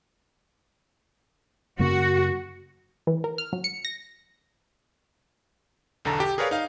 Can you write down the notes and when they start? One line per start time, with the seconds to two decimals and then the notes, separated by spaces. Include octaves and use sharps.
1.79 F#2 C#3 A#3 F#4
3.07 E3
3.24 A#4
3.38 F6
3.53 F#3
3.64 C#7
3.85 A#6
6.05 B1 E2 D3 A4 A5 A#5
6.20 G4
6.38 G#4 A#4 B4 C#5 D5 F5
6.51 D#4 F5